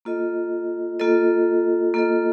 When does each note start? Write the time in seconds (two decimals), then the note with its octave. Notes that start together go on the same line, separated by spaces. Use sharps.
0.05 A#3 F4 A4 D#5
0.99 A#3 F4 A4 D#5
1.94 A#3 F4 A4 D#5